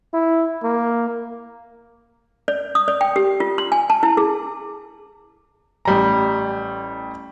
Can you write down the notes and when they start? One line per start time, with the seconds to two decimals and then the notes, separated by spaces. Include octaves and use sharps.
0.14 E4
0.63 A#3
2.48 D5
2.75 D#6
2.88 D5
3.01 G5
3.16 G4
3.40 F4
3.58 C6
3.72 G#5
3.90 A5
4.03 E4
4.17 G#4
5.85 A1 G3 A#5